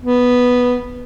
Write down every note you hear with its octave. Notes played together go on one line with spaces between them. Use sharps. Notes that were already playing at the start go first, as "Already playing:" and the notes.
B3